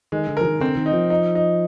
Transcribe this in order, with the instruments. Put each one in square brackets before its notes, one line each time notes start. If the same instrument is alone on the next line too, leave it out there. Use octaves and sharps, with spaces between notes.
[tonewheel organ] D#3 [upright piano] G#3
[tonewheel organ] D3
[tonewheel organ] F3 [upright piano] A#4
[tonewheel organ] D#3
[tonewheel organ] D3 [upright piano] C4
[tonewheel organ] D#3
[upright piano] D#4
[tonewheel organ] F3
[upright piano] D#4
D#4